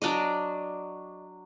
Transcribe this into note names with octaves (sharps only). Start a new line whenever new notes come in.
F#3 D4 D5 D#5